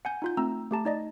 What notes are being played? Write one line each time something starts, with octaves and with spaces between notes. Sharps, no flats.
F#5 G#5 G6
D#4 F4 G6
A3 C4 A#5 E6
A3 G4 A5 A#5
D#4 D5 D#5